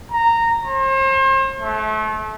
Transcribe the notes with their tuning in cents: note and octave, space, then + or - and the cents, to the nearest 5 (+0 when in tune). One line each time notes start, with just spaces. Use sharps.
A#5 -15
C5 +40
A3 -30